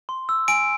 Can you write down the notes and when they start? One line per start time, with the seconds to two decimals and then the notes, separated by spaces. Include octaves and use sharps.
0.09 C6
0.29 E6
0.48 G#5 D7